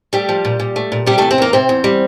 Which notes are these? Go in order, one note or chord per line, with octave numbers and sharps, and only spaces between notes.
G3 A3 G4
F3
A#2
A#2
A3
A#2
C3 G3 G4
E2 A3 A4
C4 C5
E2 A#3 A#4
C3 C4 C5
E2
G3